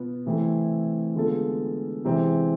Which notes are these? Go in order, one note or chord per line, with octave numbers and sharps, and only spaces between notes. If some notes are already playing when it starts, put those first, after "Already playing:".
Already playing: B2 B3 F4
C3 E3 A3 C4 E4
D3 G#3 B3 F4 A4
C3 E3 G#3 C4